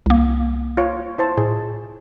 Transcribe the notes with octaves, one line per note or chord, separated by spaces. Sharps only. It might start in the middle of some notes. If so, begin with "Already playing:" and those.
C2 A#3
F4 C#5
E4 C5 A5
A2 G#4